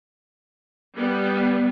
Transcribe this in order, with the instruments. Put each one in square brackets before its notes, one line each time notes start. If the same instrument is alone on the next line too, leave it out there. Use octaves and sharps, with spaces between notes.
[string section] G3 B3